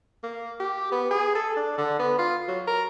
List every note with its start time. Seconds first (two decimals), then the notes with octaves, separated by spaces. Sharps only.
0.24 A#3
0.60 G4
0.92 B3
1.11 G#4
1.35 A4
1.56 D4
1.78 D3
1.99 B3
2.18 F4
2.48 F#3
2.67 A#4